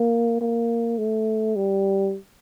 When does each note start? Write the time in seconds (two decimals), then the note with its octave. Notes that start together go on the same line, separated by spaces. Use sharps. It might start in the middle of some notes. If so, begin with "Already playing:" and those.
Already playing: A#3
0.41 A#3
0.98 A3
1.56 G3